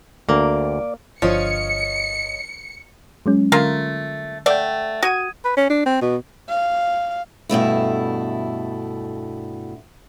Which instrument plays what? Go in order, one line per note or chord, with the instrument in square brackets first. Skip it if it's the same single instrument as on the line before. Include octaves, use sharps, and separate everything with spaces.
[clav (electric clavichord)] D2 [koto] A#3 [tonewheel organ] D5
[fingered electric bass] G1 B2 D4 [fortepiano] F3 [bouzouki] C#5 D#5 F5 [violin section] C#7
[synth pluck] F#3 G#3 C#4
[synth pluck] D3 [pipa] A3 A#3 F4
[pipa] A3 D5 [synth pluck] F#5 G5
[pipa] F#4 [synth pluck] D#6 G#6 D#7
[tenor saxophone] B4
C#4
D4
C4
B2
[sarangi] F5
[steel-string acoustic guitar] G2 B2 A3 E4